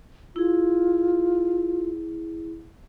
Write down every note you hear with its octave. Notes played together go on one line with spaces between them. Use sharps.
E4 F4 G#4